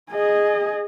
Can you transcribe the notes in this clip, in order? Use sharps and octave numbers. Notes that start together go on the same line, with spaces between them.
G#4 D#5